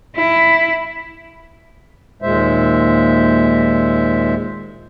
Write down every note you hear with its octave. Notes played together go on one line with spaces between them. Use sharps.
E4
D#2 A#2 G#3 C5 E5